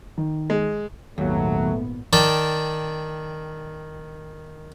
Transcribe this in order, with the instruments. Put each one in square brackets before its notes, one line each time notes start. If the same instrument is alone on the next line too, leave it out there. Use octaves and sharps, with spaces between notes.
[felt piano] D#3
[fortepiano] G#3
[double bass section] G#1 A#2 B3 [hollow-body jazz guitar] D#2 [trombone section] F#3 [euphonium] A3
[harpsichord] D#3 D5 G5 A5